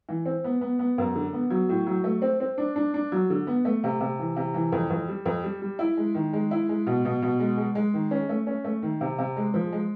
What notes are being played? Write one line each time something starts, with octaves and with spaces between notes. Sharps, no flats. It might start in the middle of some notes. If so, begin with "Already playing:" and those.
E3
C4
B3
B3
B3
F#2
D3
B3
F#3
A2
F#3
A3
C4
C4
D4
D4
D4
F#3
D3
B3
A3
C3
C3
E3
C3
E3
F2
F2
G3
F2
G3
G3
E4
G#3
D#3
G#3
E4
G#3
B2
B2
B2
G#3
G#3
G#3
D#3
C#4
A3
C#4
A3
D#3
C3
C3
G#3
F3
G#3